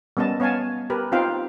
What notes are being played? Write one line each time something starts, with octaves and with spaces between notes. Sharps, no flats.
G3 B3 C#4 D#5 A5
B3 C#5 F5 G#5 A5
G4 A#4 B4
C4 D#4 F4 F5 G5